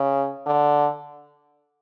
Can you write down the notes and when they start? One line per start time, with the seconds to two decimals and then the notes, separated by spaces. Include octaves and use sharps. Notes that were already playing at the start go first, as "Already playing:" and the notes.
Already playing: C#3
0.46 D3